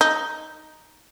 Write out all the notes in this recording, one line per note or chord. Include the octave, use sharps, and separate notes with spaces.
D#4